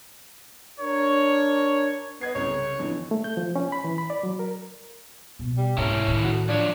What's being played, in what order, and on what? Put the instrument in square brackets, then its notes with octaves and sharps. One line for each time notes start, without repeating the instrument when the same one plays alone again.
[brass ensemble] D4 A#4 C#5
[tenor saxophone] B3 [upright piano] D#5 G#6 C7
[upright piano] C2 C#3 [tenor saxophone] C#5
[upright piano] F2 D3 E3
[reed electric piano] A3
G6
F3
C#4
B5
E3
B5
D5
F#3
A#4
[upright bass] B2
[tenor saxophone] G3
[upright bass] G#2 C3 [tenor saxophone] C#4 [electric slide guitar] E4 A4 A#4
[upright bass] A2 D#3
[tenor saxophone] F#4
[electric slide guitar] F3 C#5 [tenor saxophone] D4